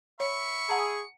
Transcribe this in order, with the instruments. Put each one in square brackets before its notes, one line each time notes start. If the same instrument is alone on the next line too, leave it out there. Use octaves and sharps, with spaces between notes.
[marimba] C#5 [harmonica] E5 B5 C#6 [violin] C#7
[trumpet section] G#4 [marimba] F#5 A5 A#5